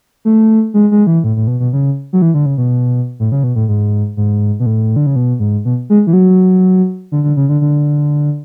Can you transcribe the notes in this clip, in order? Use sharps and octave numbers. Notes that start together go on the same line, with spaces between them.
A3
G#3
G#3
E3
A2
A2
B2
B2
C#3
F#3
E3
D3
C#3
B2
A2
C#3
B2
A2
G#2
G#2
B2
A2
D3
C#3
B2
G#2
B2
G#3
E3
F#3
D3
D3
C#3
D3
D3